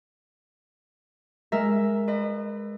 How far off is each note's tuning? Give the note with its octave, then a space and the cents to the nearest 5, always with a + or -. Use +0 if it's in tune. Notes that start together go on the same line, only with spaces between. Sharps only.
G#3 +0 A#4 +0 E5 +0
B4 +20 D#5 -35